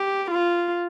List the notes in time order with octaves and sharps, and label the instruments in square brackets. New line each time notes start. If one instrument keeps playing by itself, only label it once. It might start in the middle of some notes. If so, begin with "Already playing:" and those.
Already playing: [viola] G4
F4